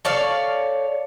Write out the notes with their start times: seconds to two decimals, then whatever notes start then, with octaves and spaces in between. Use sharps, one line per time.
0.05 A4 C#5 D5 F5